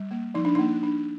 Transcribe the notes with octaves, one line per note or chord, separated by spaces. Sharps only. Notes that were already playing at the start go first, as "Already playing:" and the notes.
Already playing: G3
A#3
F3 D#4
D4
A#3 D#4
D4